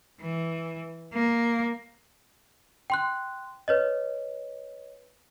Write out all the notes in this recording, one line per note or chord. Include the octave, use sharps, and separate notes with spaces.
E3
A#3
G5 C6 F#6
B4 C#5 D#5